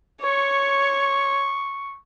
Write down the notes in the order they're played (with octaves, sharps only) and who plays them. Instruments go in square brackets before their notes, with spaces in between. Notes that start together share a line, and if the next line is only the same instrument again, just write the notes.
[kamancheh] C#5 [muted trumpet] C#6